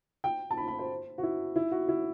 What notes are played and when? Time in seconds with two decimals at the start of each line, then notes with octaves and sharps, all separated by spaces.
0.24 G5
0.51 A5
0.57 B5
0.68 B5
0.79 C5
1.18 F#4
1.23 E4
1.56 E4
1.71 F#4
1.88 E4